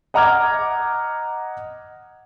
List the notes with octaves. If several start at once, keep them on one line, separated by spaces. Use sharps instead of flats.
D#5 F#5 A#5 D6 F6 G#6